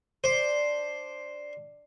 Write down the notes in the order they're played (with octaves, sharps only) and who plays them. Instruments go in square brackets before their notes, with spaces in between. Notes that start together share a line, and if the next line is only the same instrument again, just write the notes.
[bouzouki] D4 [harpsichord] C5